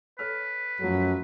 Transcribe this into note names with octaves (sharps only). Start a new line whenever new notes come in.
A4 B4 C#5 F6
F#2 F3 F#3 A3 A4